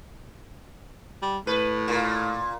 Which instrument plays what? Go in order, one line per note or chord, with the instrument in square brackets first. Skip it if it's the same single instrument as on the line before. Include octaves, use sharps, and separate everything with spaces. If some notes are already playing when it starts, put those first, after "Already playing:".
[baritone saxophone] G3
[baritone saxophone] A2 [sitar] B4
[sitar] A#2